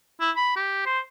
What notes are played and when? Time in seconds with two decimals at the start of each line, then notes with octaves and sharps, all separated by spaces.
0.20 E4
0.36 B5
0.56 G4
0.86 C5